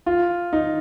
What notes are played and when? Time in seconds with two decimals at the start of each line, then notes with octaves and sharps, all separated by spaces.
0.06 F4
0.53 D#4